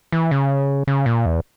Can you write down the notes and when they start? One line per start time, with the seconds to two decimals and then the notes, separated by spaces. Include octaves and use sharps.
0.12 E3
0.31 C#3
0.87 C#3
1.06 A#2
1.26 E2